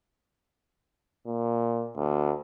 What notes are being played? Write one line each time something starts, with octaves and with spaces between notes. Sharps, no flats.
A#2
D2